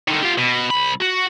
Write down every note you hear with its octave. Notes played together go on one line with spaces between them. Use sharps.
D3 D#3
F4 G4
B2
C2 B5
F#4